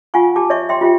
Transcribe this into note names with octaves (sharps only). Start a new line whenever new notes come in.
F4 F5 F#5 G#5 C#6
G4 A5 D6
C#5 D#5 E5 C#6
E5 G5 C6
F4 G4 E5 G5